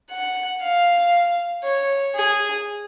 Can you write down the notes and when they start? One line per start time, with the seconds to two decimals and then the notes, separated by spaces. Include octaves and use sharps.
0.11 F#5
0.62 F5
1.64 C#5
2.15 G#4